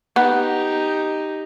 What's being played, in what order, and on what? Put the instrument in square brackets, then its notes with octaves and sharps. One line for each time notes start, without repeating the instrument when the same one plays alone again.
[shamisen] B3 [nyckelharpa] D#4 G4